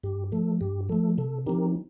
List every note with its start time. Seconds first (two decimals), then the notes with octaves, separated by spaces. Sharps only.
0.03 G2 G4
0.32 F3 A3 A4
0.61 G2 G4
0.89 F3 A3 A4
1.18 C3 A4
1.46 F3 C4 D#4 G4 A#4